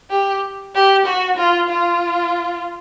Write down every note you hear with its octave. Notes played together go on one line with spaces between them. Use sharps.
G4
G4
F#4
F4
F4